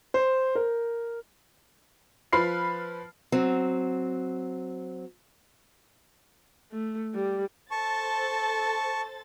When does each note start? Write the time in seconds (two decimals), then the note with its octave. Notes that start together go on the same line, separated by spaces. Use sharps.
0.14 C5
0.55 A#4
2.33 F3 B4 B5 F6 C7
3.32 F#3 C4
6.72 A3
7.14 G3
7.71 A4 C5 A5 C#6 A6